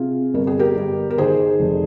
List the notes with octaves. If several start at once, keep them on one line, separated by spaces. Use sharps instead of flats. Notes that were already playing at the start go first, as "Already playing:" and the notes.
Already playing: C3 F4 G#4
G1 A#4
G#4
G4 A#4
G1
A#4
D#3 G#4 C5
F1